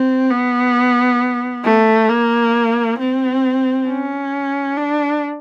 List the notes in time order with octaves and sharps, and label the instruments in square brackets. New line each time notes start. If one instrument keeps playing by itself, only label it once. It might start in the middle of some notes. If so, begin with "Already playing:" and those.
Already playing: [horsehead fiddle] C4
B3
A3
A#3
C4
C#4
D4